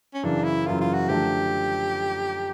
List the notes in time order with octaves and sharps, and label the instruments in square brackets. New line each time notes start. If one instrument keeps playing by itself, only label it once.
[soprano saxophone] C#4
[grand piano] F#2 C#3 E3 [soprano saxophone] D4
[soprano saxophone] E4
[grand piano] F#2 C#3 E3 [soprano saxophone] F4
[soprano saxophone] F4
F#4
[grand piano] F#2 D3 F3 A3 D4 [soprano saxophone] G4